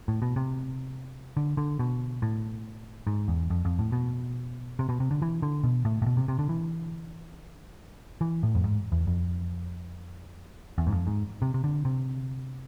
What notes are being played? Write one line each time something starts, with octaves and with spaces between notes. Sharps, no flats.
A2
B2
C3
D3
D3
B2
A2
G#2
E2
F2
F2
A2
B2
C3
B2
C3
D3
E3
D3
B2
A2
A2
B2
C3
C3
D3
E3
E3
A2
F2
G#2
E2
F2
E2
G#2
F2
G#2
C3
C3
D3
C3